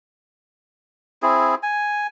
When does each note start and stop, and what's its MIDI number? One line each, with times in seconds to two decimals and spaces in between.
1.23 1.55 60
1.23 1.55 64
1.23 1.55 68
1.63 2.07 80